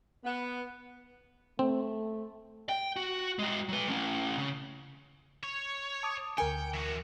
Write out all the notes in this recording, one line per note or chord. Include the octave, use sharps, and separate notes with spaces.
B3
A3 C4
G5
F#4
G#3 F#4
F#3 B4
A3 C#4
C#3
C#5
A5 D6 D#6
D2 A#4 G5 G#5 C#7
E3 F#4